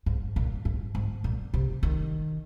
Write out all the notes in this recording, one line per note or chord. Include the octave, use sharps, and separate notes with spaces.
G#2
A#2
G#2
G#2
A#2
C3
D#3